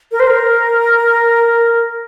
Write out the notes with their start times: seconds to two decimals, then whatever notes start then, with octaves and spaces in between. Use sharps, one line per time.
0.12 A#4
0.20 C5
0.27 A#4